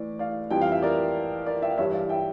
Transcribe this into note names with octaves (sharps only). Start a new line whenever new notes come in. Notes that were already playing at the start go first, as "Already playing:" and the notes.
Already playing: A2 E3 D5
D5 F5
F2 E3 G3 G5
F5
E5
A#4 D5
A#4 D5
E5 G5
F5
G2 E3 G3 C#5 E5
D5 F5
E5 G5